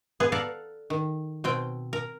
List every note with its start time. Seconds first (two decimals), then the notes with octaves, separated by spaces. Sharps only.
0.20 B3 G#4
0.32 A4 D5 F5 F#5 A#5
0.90 D#3
1.44 B2 C4 G5
1.93 A#4